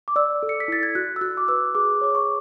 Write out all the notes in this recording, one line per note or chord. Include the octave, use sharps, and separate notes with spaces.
D6
D5 E6
A4
C#7
B6
E4 A6
G#6
F#4 F#6
E6
F#4 F#6
D6
B4 E6
G#4 D6
C#5 D6
C#6